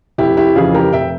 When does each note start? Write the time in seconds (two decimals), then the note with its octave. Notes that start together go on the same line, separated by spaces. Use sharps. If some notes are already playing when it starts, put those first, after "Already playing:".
0.18 F1 E4 G4
0.37 E4 G4
0.56 F2 C#3 E3 F4 G#4
0.74 G4 A#4
0.93 F1 E5 G5